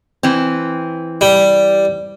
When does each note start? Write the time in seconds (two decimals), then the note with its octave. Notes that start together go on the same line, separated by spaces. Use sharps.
0.23 E3 C4
1.21 G3